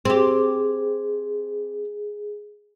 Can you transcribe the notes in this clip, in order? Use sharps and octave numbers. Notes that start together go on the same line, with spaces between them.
C4 G4 G#4